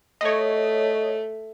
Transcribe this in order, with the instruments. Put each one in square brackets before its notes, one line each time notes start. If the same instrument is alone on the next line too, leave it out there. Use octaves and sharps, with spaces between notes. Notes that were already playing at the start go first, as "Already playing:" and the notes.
[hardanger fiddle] A3 [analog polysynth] C#5 D#5